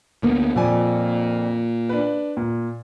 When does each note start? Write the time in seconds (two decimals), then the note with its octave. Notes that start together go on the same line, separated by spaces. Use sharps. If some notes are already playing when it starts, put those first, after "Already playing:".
0.23 D2 A#3 B3
0.56 F2 A#2 D5 G#5
1.89 D4 B4
2.37 A#2